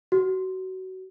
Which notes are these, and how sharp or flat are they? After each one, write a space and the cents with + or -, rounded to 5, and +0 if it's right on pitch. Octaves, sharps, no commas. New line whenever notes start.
F#4 +25